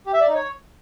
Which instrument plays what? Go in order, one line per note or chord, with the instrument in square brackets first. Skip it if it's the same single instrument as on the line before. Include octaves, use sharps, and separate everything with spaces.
[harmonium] G4
E5
D5
D#4
C#5